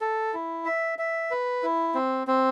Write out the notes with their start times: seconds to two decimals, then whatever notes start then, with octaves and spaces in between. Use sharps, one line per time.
0.01 A4
0.34 E4
0.65 E5
0.99 E5
1.31 B4
1.63 E4
1.95 C4
2.27 C4